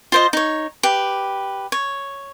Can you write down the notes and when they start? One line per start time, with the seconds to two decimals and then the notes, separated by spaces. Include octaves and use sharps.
0.12 F4 C5 D#5
0.33 D#4 C#5
0.83 G4 B4
1.72 C#5